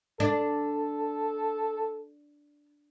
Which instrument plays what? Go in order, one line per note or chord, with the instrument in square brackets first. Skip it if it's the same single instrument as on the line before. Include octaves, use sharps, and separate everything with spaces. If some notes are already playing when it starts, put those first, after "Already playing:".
[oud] D4 [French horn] A4